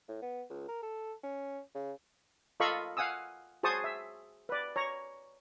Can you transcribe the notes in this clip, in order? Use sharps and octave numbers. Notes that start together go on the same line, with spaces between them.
A2
B3
C#2
A#4
A4
C#4
C#3
F4 A4 D#5 F5 B5 C#6
F5 F#5 G#5 D#6 E6
F#4 G#4 C5 A5 C#6 D#6
E5
B4 D5
C#5 A#5